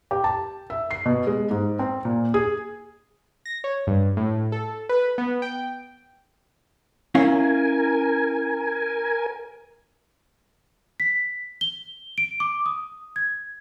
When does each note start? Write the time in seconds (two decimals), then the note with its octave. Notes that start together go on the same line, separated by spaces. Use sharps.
0.11 G4
0.24 A5
0.70 E5
0.91 C7
1.06 B2
1.27 G#3
1.51 G#2
1.79 C4
2.05 A#2
2.34 G#4
3.46 A#6
3.64 C#5
3.87 G2
4.17 A2
4.52 A4
4.89 B4
5.18 B3
5.42 G5
7.15 C#4 E4 A#4 F5 G#5
11.00 B6
11.61 G7
12.18 D7
12.40 D6
12.66 D#6
13.16 G#6